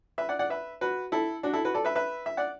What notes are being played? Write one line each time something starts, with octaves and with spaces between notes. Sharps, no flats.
B4 E5
D5 F#5
D5 F#5
B4 E5
F#4 B4
E4 A4
D4 F#4
E4 A4
F#4 B4
A4 D5
B4 E5
B4 E5
E5
D5 F#5